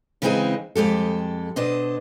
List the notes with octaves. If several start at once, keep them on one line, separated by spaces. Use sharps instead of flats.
C#3 E3 G#3 C4 D#4 G#4
F2 G#3 G4 A4
B2 D4 C5 D#5